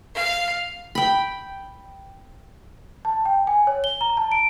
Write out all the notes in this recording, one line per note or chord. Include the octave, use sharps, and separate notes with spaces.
F5
G5 B5
A5
G5
G#5
C#5
G7
A#5
A5
D7